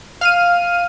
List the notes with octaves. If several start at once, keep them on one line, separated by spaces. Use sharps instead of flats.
F5 F6 D#7